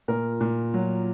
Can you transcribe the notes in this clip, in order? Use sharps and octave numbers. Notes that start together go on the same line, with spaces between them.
A#2 A#4
A#2
F#3